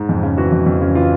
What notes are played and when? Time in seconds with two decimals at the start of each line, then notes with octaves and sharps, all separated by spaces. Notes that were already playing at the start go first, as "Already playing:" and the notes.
Already playing: G#2
0.09 F2
0.23 C#3
0.38 E3 F#4
0.52 F2
0.66 F2
0.81 C#3
0.95 E3 F4